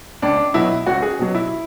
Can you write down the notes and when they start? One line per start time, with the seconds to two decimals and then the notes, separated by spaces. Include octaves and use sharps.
0.22 C#2 D4
0.54 B2 F#3 E4
0.86 C#2 F#4
1.02 G#4
1.19 B2 F#3
1.35 E4